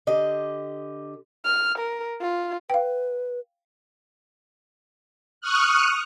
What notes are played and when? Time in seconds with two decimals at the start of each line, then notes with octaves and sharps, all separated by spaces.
0.07 D3 G4 D#5
1.45 F6
1.78 A#4
2.22 F4
2.70 B4 F5 G5
5.41 C#6 D#6 F6 F#6